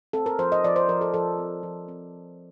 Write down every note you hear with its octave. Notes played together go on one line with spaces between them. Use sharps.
C4 A4
A#4
F3 C5
D#5
F3 D5
C5
F3 A#4
A4
F3 A4
C4
F3
C4